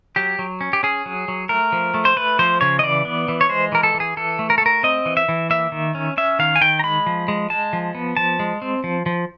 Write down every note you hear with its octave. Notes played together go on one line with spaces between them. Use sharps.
F#3 G4
F#3
C#4
G4
C#4 G#4
F#3
F#3
A3 A#4
F3
A3
C5
A3 B4
F3 C5
C#3 C#5
D#5
E3 D5
B3
E3
C#5
G#3 C5
E3 A#4
A4
E3
G#4
E3 A4
A3
A#4
A4
A3 A#4
C4 D#5
E3
E5
E3
A#3 E5
D#3
C#4
C#4 E5
D#3 F5
G#5
D#3 G5
A#5
G#3 B5
F3
G#3
G#3 A5
F3
B3
F3 A5
G#3
C4
F3
F3